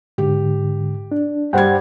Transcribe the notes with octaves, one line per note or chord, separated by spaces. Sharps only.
G#2 D3 G4
D4
G2 G3 C5 F#5 G5 G#6